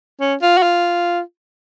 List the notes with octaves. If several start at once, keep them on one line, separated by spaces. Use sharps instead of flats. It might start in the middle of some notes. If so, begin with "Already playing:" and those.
C#4
F4
F#4
F4